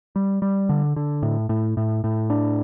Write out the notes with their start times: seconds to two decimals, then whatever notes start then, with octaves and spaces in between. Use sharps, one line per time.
0.16 G3
0.42 G3
0.69 D3
0.96 D3
1.23 A2
1.49 A2
1.77 A2
2.04 A2
2.30 D4